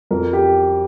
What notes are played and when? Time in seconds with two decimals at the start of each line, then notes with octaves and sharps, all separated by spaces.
0.11 F2 A#4
0.33 G4